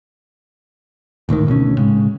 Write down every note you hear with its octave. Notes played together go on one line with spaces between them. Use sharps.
G#1 D2 A2 D#3
D2 B2 C4 C#4
A2 C#3 G#3